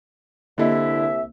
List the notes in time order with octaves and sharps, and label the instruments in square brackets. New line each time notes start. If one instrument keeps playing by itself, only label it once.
[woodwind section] C2 E5 [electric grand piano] D3 E4 [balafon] A#3 G4 D#5